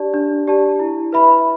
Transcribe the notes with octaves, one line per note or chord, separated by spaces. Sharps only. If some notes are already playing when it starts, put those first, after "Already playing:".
Already playing: D4 G4 D5 A5
D4
G4 D5 A5
E4
B4 E5 B5